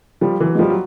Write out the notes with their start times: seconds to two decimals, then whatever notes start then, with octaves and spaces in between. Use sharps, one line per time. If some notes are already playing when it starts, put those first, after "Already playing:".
0.21 F3 G3
0.40 E3 F#3
0.55 G#3
0.59 F3 G3
0.70 F#3